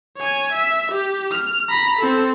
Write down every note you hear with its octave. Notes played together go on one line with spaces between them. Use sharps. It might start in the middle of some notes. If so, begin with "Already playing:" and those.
C#5 G#5
E5
G4
F6
A#5 B5
C4 A4